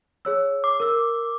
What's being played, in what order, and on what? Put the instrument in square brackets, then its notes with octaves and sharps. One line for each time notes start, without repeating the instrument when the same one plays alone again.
[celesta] G#4 C#5 E6
[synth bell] D6
[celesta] A#4 E6